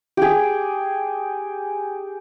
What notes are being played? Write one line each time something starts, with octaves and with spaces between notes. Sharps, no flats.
G4 G#4